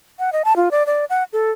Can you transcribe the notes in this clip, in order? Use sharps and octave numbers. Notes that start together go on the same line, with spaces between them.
F#5
D#5
A5
F4
D5
D5
F#5
A4